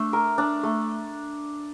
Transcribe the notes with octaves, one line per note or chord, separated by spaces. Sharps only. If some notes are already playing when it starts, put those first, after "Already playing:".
Already playing: A3 D4
A#4
D4
A3